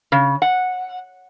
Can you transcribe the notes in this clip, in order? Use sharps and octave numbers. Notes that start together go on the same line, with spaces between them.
C#3
F#5